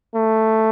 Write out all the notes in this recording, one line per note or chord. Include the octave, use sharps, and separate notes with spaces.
A3